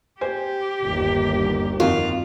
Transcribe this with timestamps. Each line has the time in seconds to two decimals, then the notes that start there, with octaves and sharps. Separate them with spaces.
0.21 G4 C5 G#5
0.82 G1 D#2
1.80 F2 D#3 F4 F#4